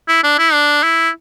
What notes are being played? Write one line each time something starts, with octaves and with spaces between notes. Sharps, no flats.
E4
D4
E4
D4
E4